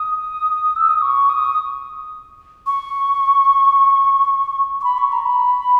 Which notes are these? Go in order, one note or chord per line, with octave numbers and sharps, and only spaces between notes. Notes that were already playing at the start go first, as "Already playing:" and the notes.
Already playing: D#6
E6
D#6
C#6
D#6
C#6
C#6
B5
C#6
A#5
B5